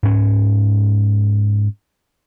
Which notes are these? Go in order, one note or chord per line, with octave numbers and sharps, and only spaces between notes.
G#2 C#4